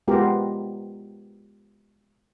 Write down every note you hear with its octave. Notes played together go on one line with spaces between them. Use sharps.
G#3 B3 F4 G4 A#4